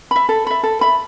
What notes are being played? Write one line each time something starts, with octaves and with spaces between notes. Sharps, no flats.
E5 B5
A4
E5 B5
A4
E5 B5